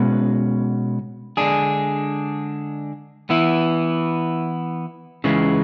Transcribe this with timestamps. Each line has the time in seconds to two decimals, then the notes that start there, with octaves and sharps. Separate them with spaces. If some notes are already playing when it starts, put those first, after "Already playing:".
Already playing: B2 G#3 C#4 F#4 B4
1.37 D3 G#3 D4 G#4
3.30 E3 B3 E4
5.24 C#2 C#3 E3 G#3